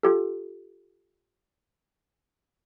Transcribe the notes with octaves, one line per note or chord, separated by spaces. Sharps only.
F4 G4 A4